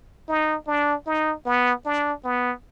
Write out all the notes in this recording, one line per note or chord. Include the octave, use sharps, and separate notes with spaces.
D#4
D4
D#4
B3
D4
B3